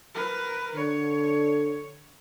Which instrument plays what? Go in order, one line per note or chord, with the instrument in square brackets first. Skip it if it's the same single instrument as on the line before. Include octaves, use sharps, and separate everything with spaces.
[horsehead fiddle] A#4 B4
[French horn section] D3 [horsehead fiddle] C#5